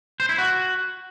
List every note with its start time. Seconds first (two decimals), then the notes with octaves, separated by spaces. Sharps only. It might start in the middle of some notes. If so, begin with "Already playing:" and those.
0.20 C5
0.29 E4
0.38 F#4